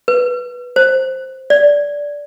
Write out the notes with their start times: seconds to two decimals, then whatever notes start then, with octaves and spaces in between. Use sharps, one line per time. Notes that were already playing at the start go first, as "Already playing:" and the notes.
0.08 B4
0.76 C5
1.50 D5